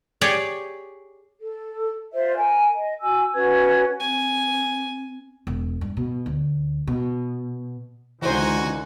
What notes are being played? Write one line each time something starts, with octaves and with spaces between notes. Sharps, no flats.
G4 G#4 C#5 D5
A4
F4 C5 D5 E5
A#4 G#5
D#5
F#4 G#5 E6
C#4 F#4 B4 G#6
C4 G#5
E1
G2
B2
D2
B2
C#2 D3 E3 D#4 F#4 C5 G#5